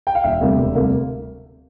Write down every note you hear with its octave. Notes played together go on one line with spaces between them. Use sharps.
G5
F5
E1 E5
D2 C3 G3 A#3
E1
D2 C3 G3 A#3